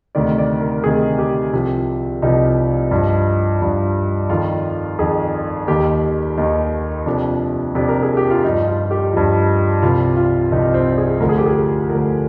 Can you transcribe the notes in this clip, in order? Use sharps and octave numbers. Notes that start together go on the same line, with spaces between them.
D2 C3 D#3 D5
D5
A#4
D2 C3 D#3 G#4
G4
C2 C3 F3
C2 C3 F3 D#4
G2 F3
G2 F3
F2 D#3 F4
F2 D#3 G#4
D#2 D#3 G4
D#2 D#3 D#4
F2 C3 F3 D4
F2 C3 F3 D4
A#4
G#4
G4
F4
G2 F3 D#4
F4
G4
G2 F3
C2 C3 F3 F4
F4
C2 C3 F3 D#4
C4
G#4
D2 D3 F3 A#4
G#4
G4
G#4
D2 D3 F3 A#4